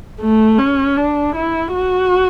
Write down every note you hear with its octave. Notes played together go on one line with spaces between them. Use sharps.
A3
C#4
D4
E4
F#4